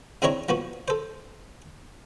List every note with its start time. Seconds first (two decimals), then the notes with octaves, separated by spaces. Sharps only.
0.22 C#3 C4 D4 E4 C#5 A#5
0.49 F3 B3 F#4
0.88 A4 C5